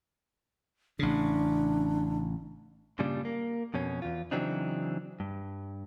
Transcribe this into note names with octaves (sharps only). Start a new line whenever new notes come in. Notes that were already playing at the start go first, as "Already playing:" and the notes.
A1 C#3 D4
G2 A#2 C#3 G3 D4
A#3
F2 B2 C#4
E2 F4
C#3 E3 F#3 C4 D4 D#4
G2